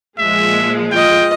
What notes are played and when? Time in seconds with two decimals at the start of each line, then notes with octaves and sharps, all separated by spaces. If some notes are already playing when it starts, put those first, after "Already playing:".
0.18 A#2 F3 G#3 E5
0.92 F4 D#5 G5